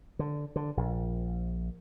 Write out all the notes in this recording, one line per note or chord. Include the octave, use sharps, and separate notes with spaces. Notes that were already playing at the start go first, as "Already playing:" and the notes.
D3
D3
A#1